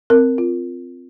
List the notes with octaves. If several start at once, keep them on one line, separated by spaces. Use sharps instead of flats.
C4 A#4
F4